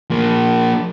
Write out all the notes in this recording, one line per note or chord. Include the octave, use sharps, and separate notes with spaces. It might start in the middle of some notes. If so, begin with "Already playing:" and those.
F3 A#3